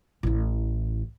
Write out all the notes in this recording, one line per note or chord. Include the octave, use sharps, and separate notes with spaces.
A1 E4